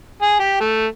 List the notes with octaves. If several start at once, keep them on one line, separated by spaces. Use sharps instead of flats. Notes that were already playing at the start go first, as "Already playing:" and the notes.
G#4
G4
A3